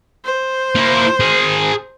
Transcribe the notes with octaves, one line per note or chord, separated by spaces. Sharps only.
C5
A#3 E4
G#4 A#4